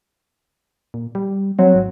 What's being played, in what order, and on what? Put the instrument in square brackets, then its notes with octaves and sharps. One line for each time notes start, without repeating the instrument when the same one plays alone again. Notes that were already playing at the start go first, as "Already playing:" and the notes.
[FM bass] A#2
G3
[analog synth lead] F#3 [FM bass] C4
[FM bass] G#1